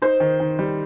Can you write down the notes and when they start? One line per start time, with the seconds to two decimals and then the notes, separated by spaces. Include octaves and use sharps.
0.02 D#4 C5
0.20 D#3
0.40 D#3
0.59 G3